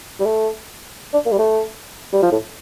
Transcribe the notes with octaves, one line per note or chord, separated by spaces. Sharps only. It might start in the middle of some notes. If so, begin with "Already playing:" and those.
G3
A3
D4
A#3
G3
A3
G3
F3
A2